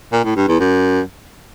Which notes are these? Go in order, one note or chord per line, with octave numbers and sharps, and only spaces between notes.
A#2
A2
G2
E2
F#2